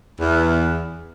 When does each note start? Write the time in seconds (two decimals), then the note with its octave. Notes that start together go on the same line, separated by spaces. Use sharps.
0.20 E2